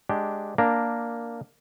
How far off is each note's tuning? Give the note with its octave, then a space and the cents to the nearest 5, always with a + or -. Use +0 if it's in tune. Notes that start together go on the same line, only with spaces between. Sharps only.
G#3 +0 D4 +0 G4 -10
A#3 +0 D4 +0 A#5 +0